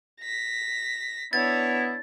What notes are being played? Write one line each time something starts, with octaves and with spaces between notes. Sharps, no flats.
A#6 B6
B3 D4 E4 C#5 A6